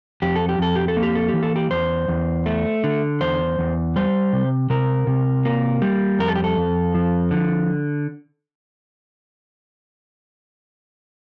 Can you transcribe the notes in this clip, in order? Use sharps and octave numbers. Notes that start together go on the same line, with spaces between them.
F2 G4
A4
G4
F2 A4
G4
A4
A#3
G4
A4
G4
E3
A4
G4
E2 C5
E2
A3
D3
E2 C5
E2
G3 C5
C3
C3 A#4
C3
A#3
G3
F2 A#4
A4
G4
A4
F2
F3
D3